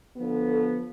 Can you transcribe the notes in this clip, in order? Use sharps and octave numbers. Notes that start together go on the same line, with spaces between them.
D3 F3 B3
A4